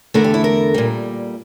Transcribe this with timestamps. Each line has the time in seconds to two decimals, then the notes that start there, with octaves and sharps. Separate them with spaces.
0.14 E2 D3 A3 A#4
0.24 G4
0.34 E4
0.44 A#4
0.74 A#2 G3